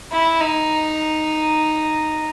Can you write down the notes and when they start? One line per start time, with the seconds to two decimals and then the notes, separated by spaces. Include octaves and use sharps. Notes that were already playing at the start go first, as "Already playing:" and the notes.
0.13 E4
0.41 D#4